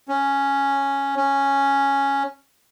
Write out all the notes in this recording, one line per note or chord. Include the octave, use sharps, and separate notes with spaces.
C#4
C#4